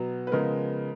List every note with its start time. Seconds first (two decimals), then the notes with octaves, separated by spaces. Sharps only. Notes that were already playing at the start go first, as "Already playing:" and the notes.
Already playing: B2 F#3 B3
0.27 B4
0.31 C#3 F3 G#3 B3 A#4